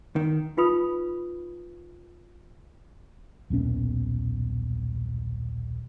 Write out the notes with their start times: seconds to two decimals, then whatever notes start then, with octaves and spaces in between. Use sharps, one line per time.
0.16 D#3
0.57 D#4 F4 B4 B5 D#6
3.50 D#1 B1 B3 C#4